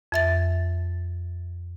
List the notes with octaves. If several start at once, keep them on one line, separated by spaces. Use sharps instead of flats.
F2 E5 A6